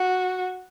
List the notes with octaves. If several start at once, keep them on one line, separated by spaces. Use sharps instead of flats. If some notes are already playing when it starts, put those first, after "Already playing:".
Already playing: F#4